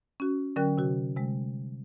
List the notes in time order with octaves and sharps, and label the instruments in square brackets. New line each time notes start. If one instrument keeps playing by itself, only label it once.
[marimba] C#4 F#4
D3 F#3 C#4 A#4 G5 F#6
C3 F#4
C3 G3 G#3